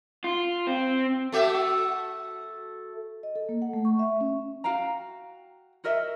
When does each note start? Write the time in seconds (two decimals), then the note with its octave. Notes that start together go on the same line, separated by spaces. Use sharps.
0.24 F4
0.67 C4
1.32 A3 F#4 E5
3.23 D#5
3.36 A4
3.49 A#3
3.62 F#5
3.73 A3
3.85 C#6
3.99 E5
4.21 C#4
4.64 F#4 F5 G5 A#5
5.84 F#4 A#4 D#5 E5